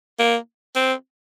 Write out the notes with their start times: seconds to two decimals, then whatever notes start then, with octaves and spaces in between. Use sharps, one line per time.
0.19 A#3
0.76 C4